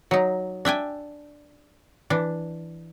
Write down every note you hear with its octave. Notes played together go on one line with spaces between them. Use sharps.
F#3 D#4
D4 E5 G5 G#5
E3 D4